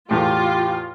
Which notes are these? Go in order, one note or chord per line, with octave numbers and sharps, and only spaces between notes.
E2 A2 F4 G4